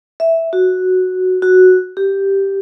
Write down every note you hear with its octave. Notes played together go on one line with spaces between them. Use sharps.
E5
F#4
F#4
G4